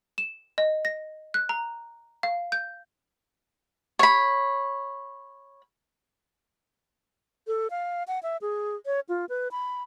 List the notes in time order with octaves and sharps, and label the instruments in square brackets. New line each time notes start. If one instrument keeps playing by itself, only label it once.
[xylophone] E7
D#5
A#6
F#6
A#5
F5
G6
[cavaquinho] C#5 B5
[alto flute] A4
F5
F#5
E5
G#4
C#5
F4
B4
B5